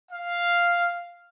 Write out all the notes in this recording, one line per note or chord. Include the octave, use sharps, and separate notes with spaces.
F5